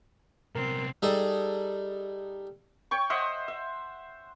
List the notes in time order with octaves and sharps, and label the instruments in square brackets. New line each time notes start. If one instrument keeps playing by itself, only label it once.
[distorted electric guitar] C2 B3 [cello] C4 [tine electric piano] A#4
[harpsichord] G3 D#4 G#4 A4
[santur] C#5 G5 C#6
C5 D#5 E5 F#5
E5